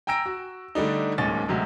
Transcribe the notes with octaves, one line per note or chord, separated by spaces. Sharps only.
G5 G#5 A#5 E6 A#6 D7
F#4
D3 G3 A3 D4 D#4
D1 D#2 G#3 C#4 A6
D2 C3 F#3 G#3